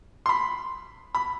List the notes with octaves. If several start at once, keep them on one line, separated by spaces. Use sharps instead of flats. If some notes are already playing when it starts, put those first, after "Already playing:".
C6
B5
B5